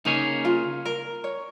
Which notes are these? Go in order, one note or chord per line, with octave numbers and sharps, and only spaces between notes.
C#3 A#3 C#4 D#4 G#4 C#5
F4
A#4
C#5